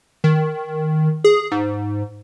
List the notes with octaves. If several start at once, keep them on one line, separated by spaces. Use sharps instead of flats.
D#3
G#4
G#2